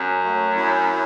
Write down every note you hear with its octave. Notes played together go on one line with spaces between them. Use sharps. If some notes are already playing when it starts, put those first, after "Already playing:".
Already playing: F#2
F#3 A3
C#4 E4